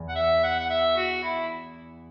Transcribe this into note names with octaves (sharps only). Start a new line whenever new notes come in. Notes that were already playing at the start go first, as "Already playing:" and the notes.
Already playing: E2
F#5
E5
F#5
F#5
E5
F#4
E4